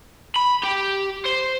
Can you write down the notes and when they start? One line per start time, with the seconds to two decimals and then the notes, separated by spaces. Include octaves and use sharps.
0.36 B5
0.63 G4
1.25 C5